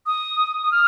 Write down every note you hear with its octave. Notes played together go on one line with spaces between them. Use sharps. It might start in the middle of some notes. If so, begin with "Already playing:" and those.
D#6
D#6
F6